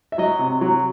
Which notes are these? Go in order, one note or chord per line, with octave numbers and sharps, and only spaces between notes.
E5
F#3 D#5
C3
F#3